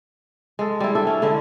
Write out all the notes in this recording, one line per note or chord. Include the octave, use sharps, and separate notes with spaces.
G#3 A4
G3 E4
D4 A4 E5
C#4
D3 G#3 E4